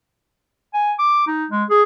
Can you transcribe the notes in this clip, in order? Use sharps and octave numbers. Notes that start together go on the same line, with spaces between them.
G#5
D6
D#4
G#3
G#4